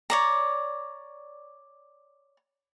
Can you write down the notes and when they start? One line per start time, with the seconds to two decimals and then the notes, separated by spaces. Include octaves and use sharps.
0.10 C#5 D5 A#5